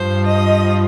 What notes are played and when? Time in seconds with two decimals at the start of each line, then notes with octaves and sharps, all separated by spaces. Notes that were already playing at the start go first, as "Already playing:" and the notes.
Already playing: G2 F3 C5
0.26 D#5